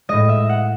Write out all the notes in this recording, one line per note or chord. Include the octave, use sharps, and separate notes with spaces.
A2 G#3 D#5
E5
F#5